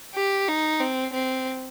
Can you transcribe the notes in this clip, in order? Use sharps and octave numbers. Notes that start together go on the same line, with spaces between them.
G4
D#4
C4
C4